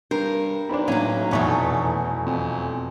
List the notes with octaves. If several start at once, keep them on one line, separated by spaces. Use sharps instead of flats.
G2 A#4 C5
B1 D4 C5 B5
A2 F#3 A#3 C#4
F1 E2 B2 A3 B3 C#6
F2